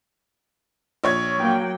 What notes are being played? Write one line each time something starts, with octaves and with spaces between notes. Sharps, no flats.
A#1 C#5 G#6
F#3 A#3 G5